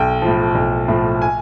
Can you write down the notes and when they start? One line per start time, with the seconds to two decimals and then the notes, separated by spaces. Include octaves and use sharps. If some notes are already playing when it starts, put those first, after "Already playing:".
Already playing: B1 G5
0.22 A2 F3
0.55 B1
0.88 A2 F3
1.22 G#5